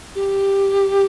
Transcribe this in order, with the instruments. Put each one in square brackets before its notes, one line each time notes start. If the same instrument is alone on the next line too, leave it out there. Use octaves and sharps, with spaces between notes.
[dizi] G4